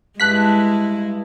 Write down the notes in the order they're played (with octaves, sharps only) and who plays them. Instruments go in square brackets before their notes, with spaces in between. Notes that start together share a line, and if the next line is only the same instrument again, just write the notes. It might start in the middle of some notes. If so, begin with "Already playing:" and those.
[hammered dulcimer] G2 A5 [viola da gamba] G#3 E4 [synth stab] F#6 B6